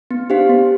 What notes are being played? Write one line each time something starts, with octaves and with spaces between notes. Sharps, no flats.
B3
D4 G4 C5 F5
B3